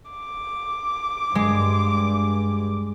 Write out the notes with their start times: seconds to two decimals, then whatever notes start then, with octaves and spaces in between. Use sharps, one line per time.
0.11 D6
1.35 G2 G#3